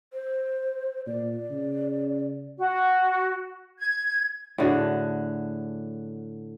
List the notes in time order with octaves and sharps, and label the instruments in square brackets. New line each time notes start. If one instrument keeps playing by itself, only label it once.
[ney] C5
[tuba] A#2 [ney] D5
[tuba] C#3
[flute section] F#4
G#6
[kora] A2 D3 F#4 G#4